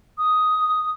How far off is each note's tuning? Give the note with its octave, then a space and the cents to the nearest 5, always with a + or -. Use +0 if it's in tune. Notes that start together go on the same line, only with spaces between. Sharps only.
D#6 +5